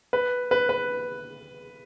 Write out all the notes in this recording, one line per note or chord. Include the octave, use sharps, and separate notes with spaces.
B4
B4
B4